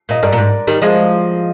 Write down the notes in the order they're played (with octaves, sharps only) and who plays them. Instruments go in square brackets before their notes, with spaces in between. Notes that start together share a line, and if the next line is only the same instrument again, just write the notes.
[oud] A#2 [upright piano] D#5
[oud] G2 [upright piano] A#4 D5
[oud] A#2
G#2
D#3 G3
[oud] F3 G#3 [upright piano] C5 D#5